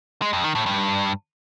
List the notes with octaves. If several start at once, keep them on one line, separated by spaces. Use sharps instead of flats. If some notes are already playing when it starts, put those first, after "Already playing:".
G#3
F2
D#3
A2
G2